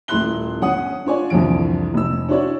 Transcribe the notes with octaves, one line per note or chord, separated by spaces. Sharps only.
D#1 A3 E4 C6 F#6 G7
G1 C#4 F#5 D#6
D4 F4 C#5 D5 G#5
C2 F2 D3 E3 D7
F1 E6
C#4 D4 E4 F#4 C#5 D5